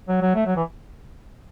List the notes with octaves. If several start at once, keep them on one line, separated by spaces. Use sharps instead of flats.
F#3
F#3
A3
F#3
E3